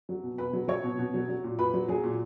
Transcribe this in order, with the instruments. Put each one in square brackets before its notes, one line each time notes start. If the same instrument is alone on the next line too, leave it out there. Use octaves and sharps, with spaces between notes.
[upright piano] F#3
B2
B2 B4 B5
F#3
F#3 C#5 C#6
B2
B2
F#3
F#3
A#2
A#2 B4 B5
F#3
F#3 G#4 G#5
A#2